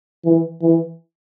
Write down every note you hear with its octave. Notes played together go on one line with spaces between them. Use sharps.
E3
E3